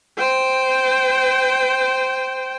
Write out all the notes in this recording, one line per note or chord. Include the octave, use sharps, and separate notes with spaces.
C5 G5